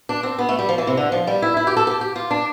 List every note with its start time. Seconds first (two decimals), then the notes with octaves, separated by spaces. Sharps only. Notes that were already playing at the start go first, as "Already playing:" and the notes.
0.09 D4
0.23 C4
0.39 B3
0.49 A3
0.59 G3
0.69 F3
0.78 E3
0.87 C3
0.97 D3
1.12 F3
1.27 G3
1.42 E4
1.57 E4
1.67 G4
1.77 A4
1.87 G4
2.01 G4
2.16 F4
2.31 D4